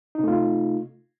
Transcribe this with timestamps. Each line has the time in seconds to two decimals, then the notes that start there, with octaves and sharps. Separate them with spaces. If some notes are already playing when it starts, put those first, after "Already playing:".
0.15 D#4
0.19 C3
0.24 A3
0.28 F4